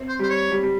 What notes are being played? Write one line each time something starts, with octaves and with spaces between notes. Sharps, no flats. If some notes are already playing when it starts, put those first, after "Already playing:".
Already playing: C4
C5
G3 C5
C#5
G3
G3